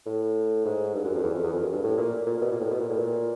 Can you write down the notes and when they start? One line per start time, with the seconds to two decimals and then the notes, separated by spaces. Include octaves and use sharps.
0.06 A2
0.66 G#2
0.95 G2
1.05 F#2
1.15 F2
1.24 E2
1.34 F2
1.43 E2
1.53 F2
1.63 F#2
1.73 G2
1.84 A2
1.98 A#2
2.27 A#2
2.38 A#2
2.41 B2
2.52 A#2
2.61 A2
2.71 B2
2.81 A#2
2.90 A2
2.99 A#2